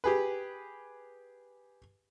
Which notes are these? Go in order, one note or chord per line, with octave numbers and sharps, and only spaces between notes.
G4 G#4 B4